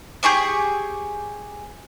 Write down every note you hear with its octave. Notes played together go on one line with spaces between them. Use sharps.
G4 G#4 C#6 D6